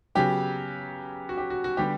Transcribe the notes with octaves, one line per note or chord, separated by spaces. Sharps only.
C#3 F#3 B3 G4
F#4
G4
F#4
F#4
D3 G3 B3 G4